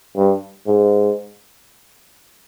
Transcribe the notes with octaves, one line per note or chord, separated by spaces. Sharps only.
G2
G#2